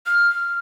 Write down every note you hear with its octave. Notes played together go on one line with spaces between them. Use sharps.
F6